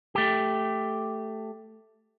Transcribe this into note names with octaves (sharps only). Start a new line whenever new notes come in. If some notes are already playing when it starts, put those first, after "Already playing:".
A3 G4